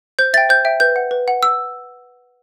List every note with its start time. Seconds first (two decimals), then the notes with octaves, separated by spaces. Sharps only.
0.19 C5 G6
0.34 E5 A6
0.37 G5
0.49 C5 G6
0.65 E5 G5
0.80 B4 G6
0.96 F#5
1.11 B4
1.28 F#5
1.43 E6